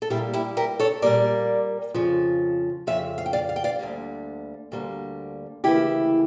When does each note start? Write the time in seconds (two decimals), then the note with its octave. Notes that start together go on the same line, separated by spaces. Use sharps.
0.02 A4
0.10 A#2 G3 A#3 E4 G4
0.33 E4 G4
0.57 G4 A#4
0.79 A4 C#5
1.02 A#2 G3 A#3 A#4 D5
1.94 F2 C#3 F3
2.87 F2 C#3 F3 E5
3.18 F5
3.26 G5
3.33 D5 F5
3.49 F5
3.56 G5
3.64 D5 F5
3.79 D2 D3 G3 A#3
4.72 D2 D3 G3 A#3
5.64 D2 C#3 E3 A#3 E4 G4